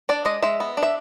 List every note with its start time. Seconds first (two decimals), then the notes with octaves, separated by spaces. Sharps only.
0.09 D4 D5
0.25 G#3 D#5
0.42 G#3 E5
0.60 B3
0.77 D4
0.83 E5